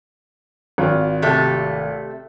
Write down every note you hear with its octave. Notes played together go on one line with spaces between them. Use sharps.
G#1 F4
C3 A3 G4